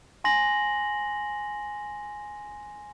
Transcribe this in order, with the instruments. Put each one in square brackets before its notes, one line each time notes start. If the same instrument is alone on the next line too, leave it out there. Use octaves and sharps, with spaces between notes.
[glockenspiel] G#5 C6 A#6 F#7